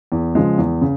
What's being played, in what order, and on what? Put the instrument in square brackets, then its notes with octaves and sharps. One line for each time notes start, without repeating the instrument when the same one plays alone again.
[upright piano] E2
C#3 F3 G#3
E2
C#3